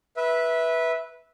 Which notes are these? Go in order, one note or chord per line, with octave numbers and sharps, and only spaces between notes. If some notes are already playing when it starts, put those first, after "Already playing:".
B4 E5